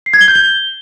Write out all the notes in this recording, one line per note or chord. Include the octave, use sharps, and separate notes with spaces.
C7
G#6
G7
G6
G7